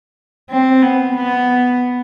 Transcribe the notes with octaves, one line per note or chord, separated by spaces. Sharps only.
C4
B3
B3